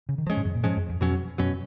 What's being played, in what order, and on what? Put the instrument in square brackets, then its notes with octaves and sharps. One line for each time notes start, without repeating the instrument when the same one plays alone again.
[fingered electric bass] C#3
D#3
[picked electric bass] F3 G#3 C#4
[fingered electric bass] G#2
F#2
A#2
[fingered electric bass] G#2 [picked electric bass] F3 G#3 C#4
[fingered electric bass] F#2
F2
[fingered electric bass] F2 [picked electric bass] B2 F#3 C#4
[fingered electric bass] F#2 [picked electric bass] B2 F#3 C#4